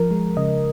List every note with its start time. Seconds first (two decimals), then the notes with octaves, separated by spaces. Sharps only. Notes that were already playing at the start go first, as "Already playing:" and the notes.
Already playing: F3 A#4
0.11 G#3
0.37 C#3 D#5